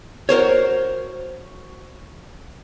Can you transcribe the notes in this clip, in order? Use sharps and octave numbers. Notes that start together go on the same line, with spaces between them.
F#4 A#4 C5 C#5